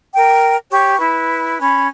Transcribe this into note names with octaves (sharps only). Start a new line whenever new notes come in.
A#4 G5
G4 C#5 C#6
E4 B4
C#4 B5